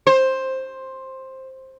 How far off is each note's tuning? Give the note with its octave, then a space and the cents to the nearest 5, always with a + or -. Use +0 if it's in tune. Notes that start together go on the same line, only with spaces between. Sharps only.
C5 +10